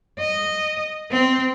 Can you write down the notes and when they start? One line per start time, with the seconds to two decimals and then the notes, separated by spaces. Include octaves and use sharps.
0.19 D#5
1.11 C4